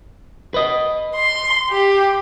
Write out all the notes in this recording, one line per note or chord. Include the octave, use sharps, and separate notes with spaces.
B4 D#5
C6
G4